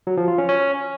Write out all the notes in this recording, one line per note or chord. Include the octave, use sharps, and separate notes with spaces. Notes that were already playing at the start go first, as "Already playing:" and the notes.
F#3
F3
F4
C#4
C#4